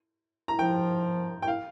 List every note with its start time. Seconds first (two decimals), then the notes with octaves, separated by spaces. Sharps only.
0.48 A#5
0.59 F3 G5
1.42 G5
1.48 F5